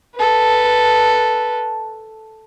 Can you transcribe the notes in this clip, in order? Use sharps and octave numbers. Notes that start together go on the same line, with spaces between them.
A4 B4